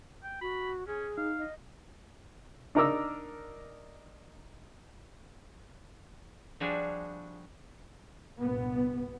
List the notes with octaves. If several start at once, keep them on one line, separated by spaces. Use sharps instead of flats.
G5
F#4 B5
C#4 G#4
D#4 F5
D#5
D4 D#4 A#4 A#5 D6 E6
F3 G3 D4 F#4 G#4
C2 G2 A#2 B3